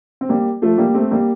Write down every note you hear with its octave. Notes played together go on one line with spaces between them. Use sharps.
C4
G3 A#3
F3 A3
G3 A#3
A3 C4
G3 A#3